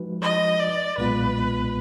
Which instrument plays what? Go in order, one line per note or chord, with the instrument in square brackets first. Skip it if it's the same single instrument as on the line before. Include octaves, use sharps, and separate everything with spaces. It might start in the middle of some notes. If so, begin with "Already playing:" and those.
Already playing: [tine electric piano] F3 G#3 D#4 F#4 B4
[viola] D#5
D5
[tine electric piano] B1 A#2 G#3 B3 F4 [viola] B4